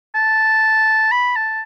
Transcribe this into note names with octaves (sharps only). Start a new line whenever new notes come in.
A5
B5
A5